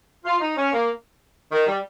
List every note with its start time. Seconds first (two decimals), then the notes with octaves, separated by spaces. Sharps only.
0.24 F4
0.40 D#4
0.56 C#4
0.73 A#3
1.52 D#3
1.67 G3